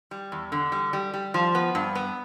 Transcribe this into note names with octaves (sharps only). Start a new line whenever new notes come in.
G3
E2
D3
G3
G3
G3
F3
B3
G2
B3